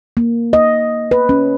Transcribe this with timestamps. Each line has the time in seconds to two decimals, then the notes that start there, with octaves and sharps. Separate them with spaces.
0.17 A#3
0.53 D#5
1.11 B4
1.29 C#4